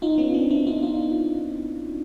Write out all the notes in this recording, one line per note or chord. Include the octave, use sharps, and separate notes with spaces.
D#4 F4
B3 C#4
C4 D4
D4 E4
D#4 F4
D#4 F4